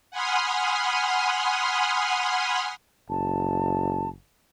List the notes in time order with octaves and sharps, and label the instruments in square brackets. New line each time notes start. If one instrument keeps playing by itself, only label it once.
[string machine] F#5 G#5 B5 C6 D#6 F6
[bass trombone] F#1 [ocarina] A5